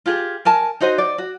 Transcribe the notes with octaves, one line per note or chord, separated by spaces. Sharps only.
F4 G4 G#4
A#4 G#5 A5
D#4 F#4 C5 D#5
D5
F#4